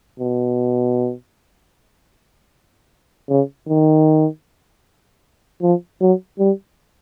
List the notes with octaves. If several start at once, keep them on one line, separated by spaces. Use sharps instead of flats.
B2
C#3
D#3
F3
F#3
G3